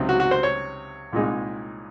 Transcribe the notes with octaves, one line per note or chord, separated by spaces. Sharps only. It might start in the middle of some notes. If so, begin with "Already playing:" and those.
Already playing: C#2 C3 F#3 C4 D#4
F#4
F#4
C5
C#5
C2 A#2 G#3 D#4